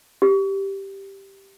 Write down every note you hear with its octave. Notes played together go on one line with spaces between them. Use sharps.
G4